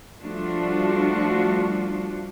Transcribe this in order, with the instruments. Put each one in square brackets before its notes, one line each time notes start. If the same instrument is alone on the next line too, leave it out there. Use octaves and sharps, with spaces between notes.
[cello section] F3 G3 A3 D4 F4 F#4